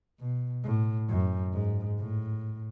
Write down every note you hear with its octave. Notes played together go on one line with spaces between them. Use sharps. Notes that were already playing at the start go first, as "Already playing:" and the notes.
B2
A2
F#2
G#2
A2